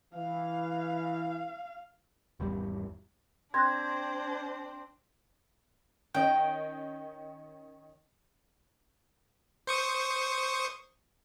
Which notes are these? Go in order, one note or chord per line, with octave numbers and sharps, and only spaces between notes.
E3 F5
G#1 E2 G3
C4 D4 C5 C6 F#6 G#6 A#6
D#3 C#4 D#5 G5
C5 C#6 D#6